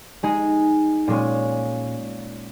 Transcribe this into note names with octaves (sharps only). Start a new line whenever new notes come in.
G#3 D#4 G#4
A#2 G#3 C#4